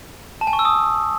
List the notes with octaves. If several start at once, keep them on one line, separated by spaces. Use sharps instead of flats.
A5
G#5
C#6
E6
D#6